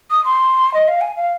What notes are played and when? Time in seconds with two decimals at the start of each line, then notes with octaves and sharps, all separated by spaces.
0.11 D#6
0.25 C6
0.74 D#5
0.88 F5
1.01 G#5
1.17 F5